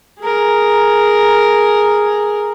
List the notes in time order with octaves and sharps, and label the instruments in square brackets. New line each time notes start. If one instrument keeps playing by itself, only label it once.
[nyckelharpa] G#4 A#4